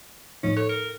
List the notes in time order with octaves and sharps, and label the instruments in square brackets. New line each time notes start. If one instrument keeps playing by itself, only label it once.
[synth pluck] A2 F3 D#4 [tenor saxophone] C#4
[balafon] A4 [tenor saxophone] C#5
[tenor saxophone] A#4 [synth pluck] C#7